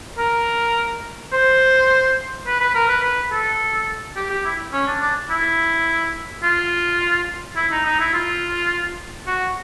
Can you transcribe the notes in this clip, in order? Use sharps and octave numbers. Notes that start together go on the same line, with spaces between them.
A#4
C5
B4
B4
A#4
B4
B4
A4
G4
G4
E4
C#4
D4
D4
E4
F4
E4
D#4
D#4
E4
F4
F#4